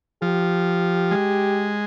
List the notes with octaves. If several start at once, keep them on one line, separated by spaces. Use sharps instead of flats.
F3 G4
G#3